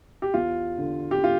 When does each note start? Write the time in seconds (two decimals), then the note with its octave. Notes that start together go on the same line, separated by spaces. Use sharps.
0.22 G4
0.34 E2 F4
0.78 D3
1.11 G4
1.24 F4